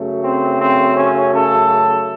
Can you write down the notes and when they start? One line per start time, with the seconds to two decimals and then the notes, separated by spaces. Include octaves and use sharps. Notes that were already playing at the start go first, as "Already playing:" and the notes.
Already playing: F#2 C#3 F#3 A3
0.24 C4
0.61 C4
0.97 C#4
1.34 A4